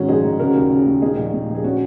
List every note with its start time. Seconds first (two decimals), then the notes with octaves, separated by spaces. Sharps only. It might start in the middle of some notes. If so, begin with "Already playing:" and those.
Already playing: G#2 D#3 C#4 F#4
0.08 A#1 D#4 G#4
0.24 A#1
0.39 C#3 F#4 A#4
0.55 D#2
0.71 C#3
0.86 D#2
1.02 A#2 D#4 G#4
1.17 A#1
1.33 A#2
1.48 A#1
1.55 G#4
1.64 A#2 C#4 F#4